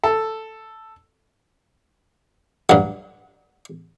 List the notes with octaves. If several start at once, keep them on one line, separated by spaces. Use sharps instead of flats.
A4
G2 F#3